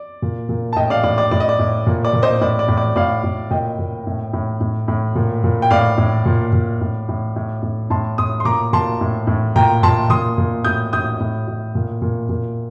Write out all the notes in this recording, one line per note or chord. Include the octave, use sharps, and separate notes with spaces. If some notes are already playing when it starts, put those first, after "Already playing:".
Already playing: D5
A#2
A#2
A5
A2 D#5 G5
D5 F5
A2 D5
D5
A2 D5
D#5
D5
A2
A#2
D5
A#2
C5 D#5
A2 D5
D5
A2
D5
A2 D5 F5
A2
A#2 D#5 G5
A#2
A2
A2
A2
A2
A#2
A#2
G5
A2 D5 F5
A2
A#2
A#2
A2
A2
A2
A2
A2 A5 C6
A2 C6 D#6
C6
A#2 A#5 D6
A#2 A5 C6
A2
A2
A#2 G5 A#5
A#2 A5 C6
A#2 C6 D#6
A#2
A2 D#6 G6
A2 D#6 G6
A2
A2
A#2
A#2
A#2